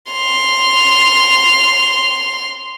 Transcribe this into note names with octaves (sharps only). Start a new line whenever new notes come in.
C6 F7